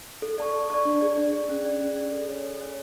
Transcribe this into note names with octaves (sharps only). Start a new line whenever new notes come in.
A4
D5 A5 C#6
A4
D5 A5 C#6
D4
G#4 D5
D4
G#4 D5
C#4
G#4 D5
C#4
G#4 D5
A4
C#5 G#5
A4
C#5 G#5